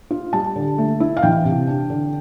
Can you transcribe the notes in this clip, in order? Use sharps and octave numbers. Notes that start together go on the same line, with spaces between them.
F4
G3 A5
D3
A3
E4
F5
E3 G5
C3
D4
D3